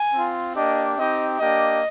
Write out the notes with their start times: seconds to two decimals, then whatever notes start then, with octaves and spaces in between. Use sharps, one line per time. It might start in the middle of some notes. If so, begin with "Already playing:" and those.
Already playing: G#5
0.14 C4 F4
0.56 A#3 D4 G4 D#5
0.98 C4 D#4 G4 D#5
1.39 A#3 D4 G4 D#5